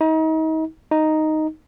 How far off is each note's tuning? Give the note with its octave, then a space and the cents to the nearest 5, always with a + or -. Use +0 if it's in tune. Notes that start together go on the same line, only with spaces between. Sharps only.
D#4 +35
D#4 +0